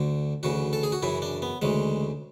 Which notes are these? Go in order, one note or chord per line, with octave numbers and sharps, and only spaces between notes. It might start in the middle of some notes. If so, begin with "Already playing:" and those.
Already playing: D2 D3
D2 C#3 E3 F#4
A4
G#4
F#4
F#2 C#3 E3 E4
D4
B3
D2 C#3 E3 G#3